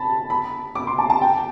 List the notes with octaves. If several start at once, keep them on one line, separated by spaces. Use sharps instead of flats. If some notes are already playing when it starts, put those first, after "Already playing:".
Already playing: A5 B5
B5
D6
C6
A5
A5
G5